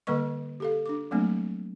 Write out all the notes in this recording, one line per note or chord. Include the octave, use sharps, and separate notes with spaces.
D3 G3 A#3 B4 D#5 C#6
G4 A4 F5
D4 D6
F#3 G3 A3 A#3 C4 D4